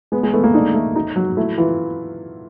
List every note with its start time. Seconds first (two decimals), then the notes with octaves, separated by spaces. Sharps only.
0.12 G#3 B3
0.23 G#3
0.33 A3 B3
0.44 A#3
0.54 D4 D#4
0.74 A3
0.96 D#4
1.16 F#3
1.37 A3 E4
1.58 E3 F4